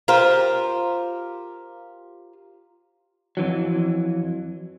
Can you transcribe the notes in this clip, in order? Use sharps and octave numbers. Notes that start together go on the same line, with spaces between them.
F4 G4 A#4 C5
F2 E3 F#3